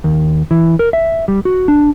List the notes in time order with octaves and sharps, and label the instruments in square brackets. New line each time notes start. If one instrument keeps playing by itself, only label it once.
[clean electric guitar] D#2
E3
A#4
E5
G3
F#4
D4